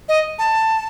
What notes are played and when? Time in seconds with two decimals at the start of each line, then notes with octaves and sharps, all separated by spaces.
0.09 D#5
0.39 A5